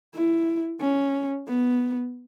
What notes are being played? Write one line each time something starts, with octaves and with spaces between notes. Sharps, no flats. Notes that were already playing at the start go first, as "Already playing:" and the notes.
E4
C#4
B3